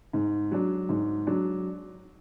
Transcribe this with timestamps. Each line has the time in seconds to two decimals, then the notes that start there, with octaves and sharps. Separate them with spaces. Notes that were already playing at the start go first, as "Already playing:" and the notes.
0.13 G#2
0.51 F#3 D4
0.89 G#2
1.27 F#3 D4